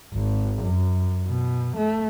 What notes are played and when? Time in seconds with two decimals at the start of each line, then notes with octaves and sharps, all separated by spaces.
0.14 G#1
0.63 F#2
1.27 B2
1.77 A3